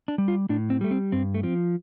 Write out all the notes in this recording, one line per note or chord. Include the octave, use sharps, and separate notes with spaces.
D4
G3
F4
A2 D4
C4
G3 A3
C4
G2 C4
A3
F3 C4